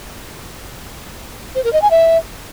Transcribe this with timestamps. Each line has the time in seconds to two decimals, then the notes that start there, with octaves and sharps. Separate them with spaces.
1.55 C5
1.64 A#4
1.73 D#5
1.82 G#5
1.91 E5